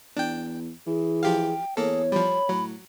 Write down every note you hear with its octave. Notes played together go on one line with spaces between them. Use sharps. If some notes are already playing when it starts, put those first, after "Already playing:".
E2 D4 G5
E3 G#4
F3 G4 F5 G5
E2 A#3 G#4 A4 C#5
F3 G3 B5
A2 F#3